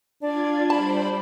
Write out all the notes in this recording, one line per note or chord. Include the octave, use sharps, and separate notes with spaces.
D4 F4 D5 G#6
G3 C5 D5 A5 B5